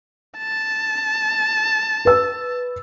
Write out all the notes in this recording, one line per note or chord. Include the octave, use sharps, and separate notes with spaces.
A5
B4 E6